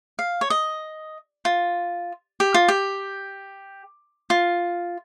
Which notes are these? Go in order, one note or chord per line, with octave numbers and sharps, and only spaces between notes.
F5
C#5
D#5
F4
G4
F4
G4
F4